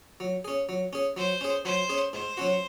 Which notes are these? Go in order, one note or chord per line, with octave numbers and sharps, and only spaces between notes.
F#3
C#4 G#4
F#3
C#4 G#4
F#3 C5
C#4 G#4
F#3 C5
C#4 G#4
G#2 C5
F#3 C#4 F#4